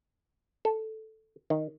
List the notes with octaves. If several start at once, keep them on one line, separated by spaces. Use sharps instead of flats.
A4
D#3